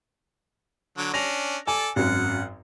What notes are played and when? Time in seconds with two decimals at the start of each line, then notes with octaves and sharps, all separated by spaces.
0.98 D3 F#3
1.14 C#4 D4 A#6 F7
1.67 A4 D5 G#5
1.96 G#1 F#2 F#5